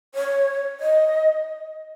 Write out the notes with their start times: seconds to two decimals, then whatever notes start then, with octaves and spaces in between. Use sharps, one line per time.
0.15 C#5
0.80 D#5